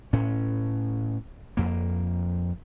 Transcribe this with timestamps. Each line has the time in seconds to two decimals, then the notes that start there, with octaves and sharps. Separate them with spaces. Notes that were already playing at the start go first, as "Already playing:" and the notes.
0.13 A2 C#4
1.57 F2 A#3